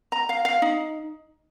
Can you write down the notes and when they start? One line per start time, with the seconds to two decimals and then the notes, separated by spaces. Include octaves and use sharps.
0.12 A#5
0.29 F5
0.45 F5
0.62 D#4